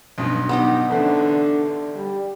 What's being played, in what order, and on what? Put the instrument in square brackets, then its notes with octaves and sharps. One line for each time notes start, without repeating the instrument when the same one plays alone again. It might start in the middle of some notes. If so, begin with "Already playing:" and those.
[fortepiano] B1 G2 B2
[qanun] B3 D#4 G4
[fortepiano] A1 B4 C5 [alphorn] D3
[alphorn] G3